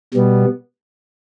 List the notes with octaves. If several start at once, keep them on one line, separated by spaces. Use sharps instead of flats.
B2 G3 B3